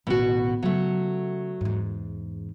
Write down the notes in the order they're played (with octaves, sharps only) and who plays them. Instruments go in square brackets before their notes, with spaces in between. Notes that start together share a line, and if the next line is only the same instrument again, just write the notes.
[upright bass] A1 D#2 [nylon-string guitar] B2 F#4
[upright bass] C#3 [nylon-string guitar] F#3 A3
[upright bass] E2 G#2